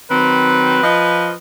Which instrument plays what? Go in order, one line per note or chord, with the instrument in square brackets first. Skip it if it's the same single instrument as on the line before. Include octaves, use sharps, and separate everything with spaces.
[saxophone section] D#3 F#3 C4 [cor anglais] B4
[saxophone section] F3 D#5